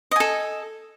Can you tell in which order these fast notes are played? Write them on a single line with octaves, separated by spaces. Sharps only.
D#5 G#5 A4